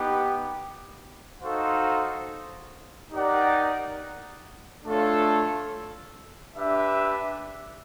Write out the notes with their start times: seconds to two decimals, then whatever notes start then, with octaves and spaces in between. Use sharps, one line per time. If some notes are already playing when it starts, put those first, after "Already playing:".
Already playing: B3 D#4 G4
1.41 D#4 F#4 A4 C5 F5
3.13 D#4 G4 A#4 D5 F#5
4.84 A3 D4 F4 A4 C#5
6.55 D4 G4 B4 E5